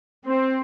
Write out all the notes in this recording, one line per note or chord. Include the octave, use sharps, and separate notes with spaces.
C4